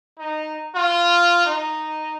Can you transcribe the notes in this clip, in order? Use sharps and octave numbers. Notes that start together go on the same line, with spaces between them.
D#4
F4
D#4